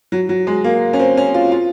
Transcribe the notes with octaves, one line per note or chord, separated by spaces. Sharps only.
F#3
F#3
G#3
A#3
C#4
C4
C#4
F4
F4